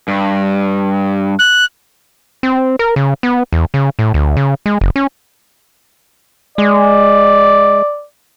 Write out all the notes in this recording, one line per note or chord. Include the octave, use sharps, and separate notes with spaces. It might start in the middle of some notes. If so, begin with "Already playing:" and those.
G2
F#6
C4
A#4
C#3
B3
E2
C#3
A2
D2
C#3
G#3
F#1
C#4
G#3 D5